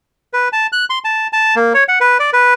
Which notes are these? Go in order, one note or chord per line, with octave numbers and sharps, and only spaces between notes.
B4
A5
F#6
C6
A5
A5
A#3
C#5
F#5
B4
D5
B4